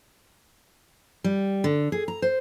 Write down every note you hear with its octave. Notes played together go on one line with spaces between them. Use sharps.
G3
D3
G#4
A#5
C5